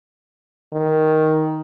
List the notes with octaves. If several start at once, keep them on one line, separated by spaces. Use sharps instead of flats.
D#3